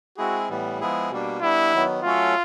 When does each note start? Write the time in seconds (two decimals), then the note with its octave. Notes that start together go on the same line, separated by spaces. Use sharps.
0.18 G#3 C4 E4 F#4 G#4
0.49 A2 E3 G3 B3
0.80 F3 G#3 B3 E4 G#4
1.11 B2 G3 A#3 D4
1.42 G3 B3 D4 E4
1.73 D#3 F#3 B3
2.04 F#3 A3 C#4 F4 F#4 A4